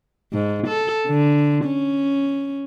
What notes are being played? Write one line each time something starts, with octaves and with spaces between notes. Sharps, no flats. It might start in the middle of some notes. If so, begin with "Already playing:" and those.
G#2
A4
D3
C#4